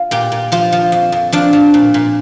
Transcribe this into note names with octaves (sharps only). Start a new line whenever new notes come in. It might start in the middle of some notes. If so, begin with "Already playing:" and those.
Already playing: F4
A#2 G4
A#2
F3 F4
F3
F2
F2
F3 D4
F3
A#2
A#2